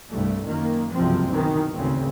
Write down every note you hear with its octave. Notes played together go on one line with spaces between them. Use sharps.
C2 G2 A3
F#2 D#3 A#3
F#1 C2 G2 C3 F3 C4
B2 D#3 E3
G#1 D2 C#3 C4